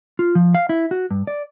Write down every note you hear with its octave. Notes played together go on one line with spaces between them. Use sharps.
F4
F3
F5
E4
F#4
G2
D5